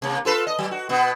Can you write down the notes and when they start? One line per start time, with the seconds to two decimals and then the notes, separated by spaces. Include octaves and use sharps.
0.02 C3 A#3
0.25 F4 A4 B4
0.47 D#5
0.59 F#3
0.71 F#4
0.89 B2 B3